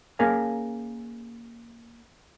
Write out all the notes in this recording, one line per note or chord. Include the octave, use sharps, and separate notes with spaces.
A#3 C#4 G#4 A#4 F5 G#5